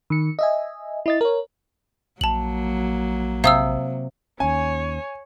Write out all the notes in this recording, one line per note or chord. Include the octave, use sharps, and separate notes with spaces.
D#3 C#7
D#5 E5 G#5
E4 D#5 A6
A#4 C#5
A#1 F#3 A#3 A5 F#7
C3 F5 D#6 E6
D#2 C#4 C#5 G#5